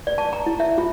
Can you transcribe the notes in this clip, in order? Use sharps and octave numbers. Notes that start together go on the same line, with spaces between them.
D5
A5
A#5
E4
E5
F4